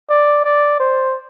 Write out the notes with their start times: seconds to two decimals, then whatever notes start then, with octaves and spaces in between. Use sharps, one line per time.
0.09 D5
0.44 D5
0.80 C5